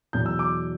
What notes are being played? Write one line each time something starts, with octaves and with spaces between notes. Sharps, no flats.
E2 B2 F#3 G6
E6
D6